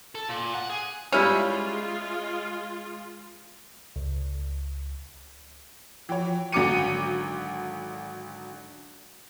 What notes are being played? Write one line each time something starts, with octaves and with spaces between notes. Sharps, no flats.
A4
A#2
F#5
G#4
G3 G#3 C#4 E4 F4 F6
C#2
E3 F3 F#4 C#5 G5
G#1 D3 F#3 D6 C#7 D#7